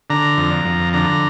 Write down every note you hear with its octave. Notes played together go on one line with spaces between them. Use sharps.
D3 A#5
F2
F2
D3 A#5